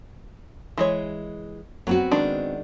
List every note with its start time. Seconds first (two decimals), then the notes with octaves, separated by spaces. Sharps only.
0.77 E3 G#3 C#5
1.87 F#3 B3 C4 F#4
2.11 D#3 G#3 D4